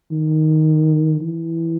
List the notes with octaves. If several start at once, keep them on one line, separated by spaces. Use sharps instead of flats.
D#3
E3